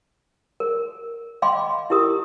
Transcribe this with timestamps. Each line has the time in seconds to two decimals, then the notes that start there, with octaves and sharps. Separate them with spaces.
0.60 A#4
1.42 D#5 F5 G5 B5 C6 D6
1.90 E4 G4 A#4 D#6